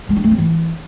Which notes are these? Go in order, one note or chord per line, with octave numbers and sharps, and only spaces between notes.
G#3
D4
A3
C4
E3